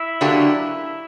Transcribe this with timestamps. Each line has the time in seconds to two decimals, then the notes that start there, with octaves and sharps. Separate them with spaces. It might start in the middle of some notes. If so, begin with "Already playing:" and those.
Already playing: E4 E5
0.21 D3 F#3 A#3 D4 G4